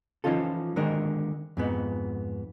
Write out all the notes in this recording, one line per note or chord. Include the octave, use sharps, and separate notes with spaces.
E3 F3 C#4 D#4 F4 A4
D3 D#3 G#3 A#4
F2 G#2 B3